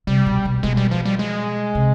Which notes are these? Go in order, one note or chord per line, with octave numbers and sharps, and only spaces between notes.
C3 G3
B2
B2
B2 G#3
G3
F3
G3
G#3
C3